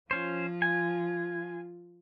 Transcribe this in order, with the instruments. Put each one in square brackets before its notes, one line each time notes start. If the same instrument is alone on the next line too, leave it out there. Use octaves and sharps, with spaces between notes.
[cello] F3 F4 [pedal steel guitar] C#4 C5
[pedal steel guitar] G#5